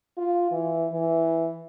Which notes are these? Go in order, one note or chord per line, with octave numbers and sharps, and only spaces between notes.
F4
E3
E3